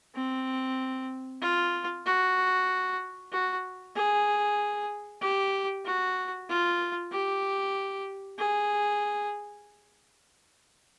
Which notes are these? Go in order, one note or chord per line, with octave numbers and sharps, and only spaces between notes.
C4
F4
F#4
F#4
G#4
G4
F#4
F4
G4
G#4